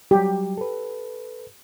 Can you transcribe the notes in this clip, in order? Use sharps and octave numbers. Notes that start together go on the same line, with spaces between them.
F#3 G3 G4
A4 B4